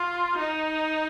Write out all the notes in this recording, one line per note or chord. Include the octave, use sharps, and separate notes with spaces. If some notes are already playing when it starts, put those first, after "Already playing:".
Already playing: F4
D#4